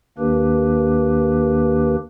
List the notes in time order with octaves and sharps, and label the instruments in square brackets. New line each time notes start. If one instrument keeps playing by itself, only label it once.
[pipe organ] D#2 D#3 A#3 D4 G4 B4